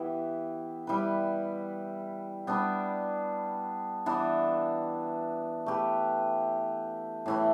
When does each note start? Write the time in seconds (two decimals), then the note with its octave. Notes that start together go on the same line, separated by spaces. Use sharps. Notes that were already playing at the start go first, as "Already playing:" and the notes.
Already playing: E3 B3 G4 B4
0.87 G3 E4 B4
2.47 G3 B3 D4
4.06 E3 B3 D4
5.66 A3 G4 B4
7.26 A2 E3 A3